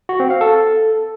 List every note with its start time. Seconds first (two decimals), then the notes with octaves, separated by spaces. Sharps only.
0.09 F#4
0.20 C4
0.30 F5
0.41 A4